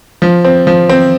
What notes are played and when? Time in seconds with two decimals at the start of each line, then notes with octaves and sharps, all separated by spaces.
0.22 F3
0.44 C4
0.67 F3
0.89 C4